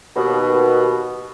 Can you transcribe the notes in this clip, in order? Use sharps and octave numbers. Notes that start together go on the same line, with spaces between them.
D#2 B2